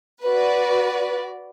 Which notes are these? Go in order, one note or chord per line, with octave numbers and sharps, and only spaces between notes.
F#4 B4 D5